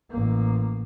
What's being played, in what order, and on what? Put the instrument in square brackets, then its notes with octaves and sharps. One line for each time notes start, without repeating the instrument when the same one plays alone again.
[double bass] A1 A#3